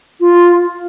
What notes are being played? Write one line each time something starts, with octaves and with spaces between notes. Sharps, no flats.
F4